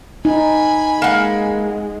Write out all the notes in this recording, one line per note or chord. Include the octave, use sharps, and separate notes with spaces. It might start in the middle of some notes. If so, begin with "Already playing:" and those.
D#4 G#5 B5
G#3 A#3 F#5